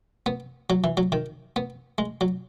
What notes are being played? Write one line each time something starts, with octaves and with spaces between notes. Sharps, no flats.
B3
F#3
E3
F#3
D#3
B3
G#3
F#3